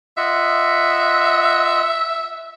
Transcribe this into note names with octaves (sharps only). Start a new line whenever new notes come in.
F4 D#5 E5 F#5